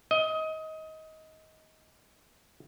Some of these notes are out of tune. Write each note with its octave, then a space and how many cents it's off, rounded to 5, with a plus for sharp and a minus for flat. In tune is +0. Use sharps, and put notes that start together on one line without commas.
D#5 +25